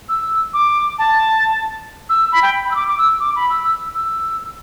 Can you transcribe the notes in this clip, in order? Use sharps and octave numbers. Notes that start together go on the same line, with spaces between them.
E6
D6
A5
E6
B5
G5
B5
E6
D6
D6
E6
D6
B5
E6
E6
E6